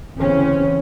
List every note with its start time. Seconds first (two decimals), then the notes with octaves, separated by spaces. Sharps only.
0.18 D2 C#3 E3 C4 C#4